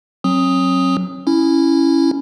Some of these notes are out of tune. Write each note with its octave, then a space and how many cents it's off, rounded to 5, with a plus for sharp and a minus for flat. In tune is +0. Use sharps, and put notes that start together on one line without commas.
F#3 +0 C4 +45 D#6 +5
C#4 +0 E4 +0